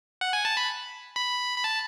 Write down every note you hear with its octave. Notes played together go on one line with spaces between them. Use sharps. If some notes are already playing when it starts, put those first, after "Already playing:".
F#5
G#5
A5
B5
B5
B5
A5